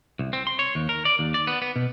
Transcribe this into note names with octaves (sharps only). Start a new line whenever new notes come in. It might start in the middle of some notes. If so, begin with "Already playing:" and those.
C2
C4
C6
C#5
D#2
A#4
D5
D#2
D5
B3
B3
B2